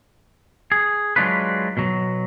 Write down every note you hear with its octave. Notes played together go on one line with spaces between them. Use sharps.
G#4
F#3 G#3 D4 F4 B4
B2 F#3